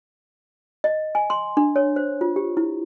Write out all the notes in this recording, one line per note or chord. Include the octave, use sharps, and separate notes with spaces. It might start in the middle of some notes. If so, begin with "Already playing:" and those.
D#5
G#5
C6
D4
C#5
C5
F4
G4
E4